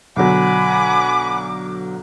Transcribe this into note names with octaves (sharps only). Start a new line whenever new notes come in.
B1 D3 F#3 F#5 G#5 B5 D6